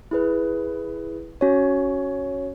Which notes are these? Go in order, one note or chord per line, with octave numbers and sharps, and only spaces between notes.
E4 G#4 B4
C#4 F#4 C#5